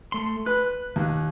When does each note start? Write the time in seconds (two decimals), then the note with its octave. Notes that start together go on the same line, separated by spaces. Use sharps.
0.12 A3 C6
0.46 B4 F#6
0.96 D#2